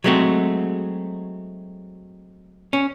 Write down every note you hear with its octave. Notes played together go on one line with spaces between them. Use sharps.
F#3 G#3 A3 C4 F#4
C#4